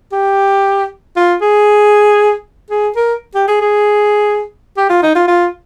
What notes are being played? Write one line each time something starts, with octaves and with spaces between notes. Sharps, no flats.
G4
F4
G#4
G#4
A#4
G4
G#4
G#4
G4
F4
D#4
F4
F4